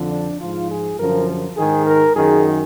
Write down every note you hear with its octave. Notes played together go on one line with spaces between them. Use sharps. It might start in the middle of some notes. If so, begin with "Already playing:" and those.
Already playing: F2 D3 F3
D4
G#2 F3 F4
G#4
F#2 D3 F3 A#4
G#2 D#3 G#4
A#4
F#2 D#3 G#4